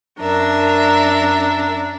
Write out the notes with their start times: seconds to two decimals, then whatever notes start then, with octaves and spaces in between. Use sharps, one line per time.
0.20 F#2 D4 A#4 E5